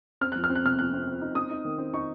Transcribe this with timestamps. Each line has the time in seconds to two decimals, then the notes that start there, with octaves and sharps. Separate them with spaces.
0.21 C4 F6
0.32 F3 F#6
0.44 F6
0.50 C4
0.55 F#6
0.64 C3 F6
0.79 F3 F#6
0.93 C4
1.07 C4
1.22 D#4
1.35 C4 D#6
1.50 D#4
1.65 D#3
1.78 C4
1.94 D#4 C#6